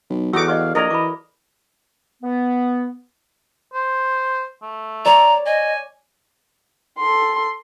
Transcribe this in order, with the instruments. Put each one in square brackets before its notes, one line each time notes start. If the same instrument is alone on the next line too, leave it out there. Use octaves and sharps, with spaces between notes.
[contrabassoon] B1
[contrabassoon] E2 [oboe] D#4 [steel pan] F#4 D6 [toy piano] A4 E6
[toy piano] G4 D5 D#5 [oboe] F5
[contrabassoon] A#1 [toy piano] E4 G#4 D5 [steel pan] A#4 [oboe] D#5
[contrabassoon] E3 [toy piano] B5 D6
[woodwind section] B3
[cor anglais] C5
A3
[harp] C#5 D5 [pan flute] A#5
[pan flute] D#5 [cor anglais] G#5
[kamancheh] A4 C6